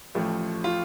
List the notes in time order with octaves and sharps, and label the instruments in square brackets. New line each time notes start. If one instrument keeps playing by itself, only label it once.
[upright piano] A1 A2 F3 A3
[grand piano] F4